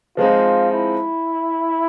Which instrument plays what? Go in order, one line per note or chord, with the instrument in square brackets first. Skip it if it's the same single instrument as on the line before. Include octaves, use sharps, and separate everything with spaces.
[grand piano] F3 G#3 C4 D#4 [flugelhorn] F4
[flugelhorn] E4